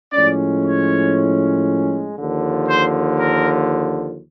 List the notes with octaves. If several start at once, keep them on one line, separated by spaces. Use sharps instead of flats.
A2 F3 G#3 C#4 D5
C#5
D#2 D3 F3
C5
A#4